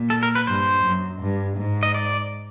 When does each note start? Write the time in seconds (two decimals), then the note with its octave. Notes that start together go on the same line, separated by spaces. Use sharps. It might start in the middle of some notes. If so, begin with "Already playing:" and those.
Already playing: A#2
0.10 A4
0.23 A#4
0.35 B4
0.47 G2 C5
0.84 F#2
1.21 G2
1.57 G#2
1.83 D#5
1.94 D5